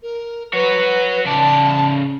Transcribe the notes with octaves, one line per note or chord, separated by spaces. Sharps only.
A#4
F#4 B4 C#5
C#3 D5 A5